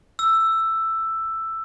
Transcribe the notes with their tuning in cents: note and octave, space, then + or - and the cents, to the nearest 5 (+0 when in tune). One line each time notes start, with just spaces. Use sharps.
E6 +5